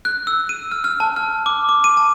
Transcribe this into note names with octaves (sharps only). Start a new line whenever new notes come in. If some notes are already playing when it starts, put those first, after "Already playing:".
F#6
E6
D#7
F6
F6
A5
F6
D6
D6
D#7
A5